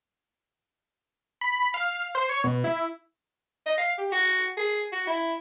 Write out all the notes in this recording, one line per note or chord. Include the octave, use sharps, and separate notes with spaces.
B5
F5
C5
C#5
B2
E4
D#5
F5
G4
F#4
G#4
F#4
E4